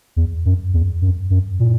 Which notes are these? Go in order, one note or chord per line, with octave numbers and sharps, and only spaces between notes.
E2
F#2
E2
F#2
F#2
A#2